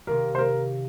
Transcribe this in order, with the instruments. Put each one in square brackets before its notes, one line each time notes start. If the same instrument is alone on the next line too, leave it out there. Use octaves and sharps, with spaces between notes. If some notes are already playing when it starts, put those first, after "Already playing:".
[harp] C3 D#3 A#3 [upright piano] A#4
[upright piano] C5
A#4